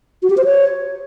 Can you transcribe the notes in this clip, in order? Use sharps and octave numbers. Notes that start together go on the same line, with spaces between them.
F#4
G4
C5
C#5